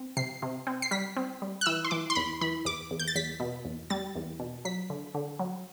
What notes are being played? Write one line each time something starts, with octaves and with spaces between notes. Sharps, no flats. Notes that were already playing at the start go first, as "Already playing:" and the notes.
Already playing: C4
C3 C7
C3
C4
C7
G3 B6
C4
G3
F#6
E3 E6
C6
E3 D6
C6
E2 B5
E3 B5
E2 D6
E2
G6
A6
E2 B6
B2
E2
G3 A6
E2
B2
F#3 B6
D3
D3
F#3